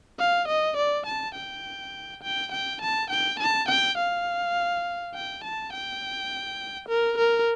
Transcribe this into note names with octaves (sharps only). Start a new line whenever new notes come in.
F5
D#5
D5
A5
G5
G5
G5
A5
G5
A5
G5
F5
G5
A5
G5
A#4
A#4